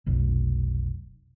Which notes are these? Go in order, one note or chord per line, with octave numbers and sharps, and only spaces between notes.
F1 B1